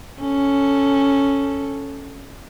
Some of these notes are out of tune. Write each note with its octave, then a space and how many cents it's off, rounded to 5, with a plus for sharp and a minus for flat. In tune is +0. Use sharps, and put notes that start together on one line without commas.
C#4 +0 A4 +0